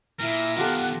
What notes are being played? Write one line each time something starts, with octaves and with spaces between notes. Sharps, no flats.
A#2 E4 A#4
B2 D#3 F4 G4 A4 F#5